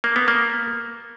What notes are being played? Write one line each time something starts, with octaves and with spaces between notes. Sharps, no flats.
A#3
B3
A#3